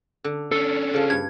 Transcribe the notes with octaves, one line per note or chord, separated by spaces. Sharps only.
D3
C#4 D4 A4
C#3 F3
G2 G#6